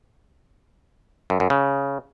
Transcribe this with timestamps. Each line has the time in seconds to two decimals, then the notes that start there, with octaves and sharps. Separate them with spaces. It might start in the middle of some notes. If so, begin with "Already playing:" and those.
1.30 F#2
1.40 F#2
1.50 C#3